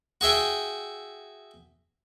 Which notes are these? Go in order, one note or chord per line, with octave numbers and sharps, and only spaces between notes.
F#4 G#4 E5 G5